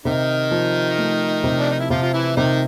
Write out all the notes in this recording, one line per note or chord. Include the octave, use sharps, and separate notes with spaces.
C3 D#3 D#4
F3
A3
C3
D4
D#4
E4
C3 F3 F4
F4
E3 E4
C3 D#3 D#4